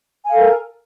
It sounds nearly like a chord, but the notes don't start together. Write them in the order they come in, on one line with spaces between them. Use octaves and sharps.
G#5 F5 A4 A#4